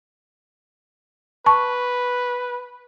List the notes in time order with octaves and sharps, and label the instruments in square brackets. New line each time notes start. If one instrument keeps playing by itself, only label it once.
[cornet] B4 [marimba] A5 C#6